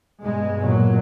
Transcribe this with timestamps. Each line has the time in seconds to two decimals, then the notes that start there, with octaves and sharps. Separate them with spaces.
0.21 G2 B2 G#3
0.60 G1 A#2 F#3